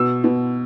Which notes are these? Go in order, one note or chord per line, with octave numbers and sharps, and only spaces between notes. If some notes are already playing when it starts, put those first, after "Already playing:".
Already playing: B2 E6
B2